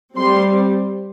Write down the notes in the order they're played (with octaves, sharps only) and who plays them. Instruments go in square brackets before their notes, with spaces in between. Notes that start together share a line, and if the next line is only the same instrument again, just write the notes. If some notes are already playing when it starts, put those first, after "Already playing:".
[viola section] G3 C4 C6